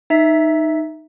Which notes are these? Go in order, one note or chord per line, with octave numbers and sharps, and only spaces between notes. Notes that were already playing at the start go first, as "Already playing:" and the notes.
D#4 E5 B6